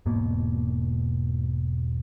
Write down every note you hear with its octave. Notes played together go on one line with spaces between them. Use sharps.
E1 G#2 B2 A#3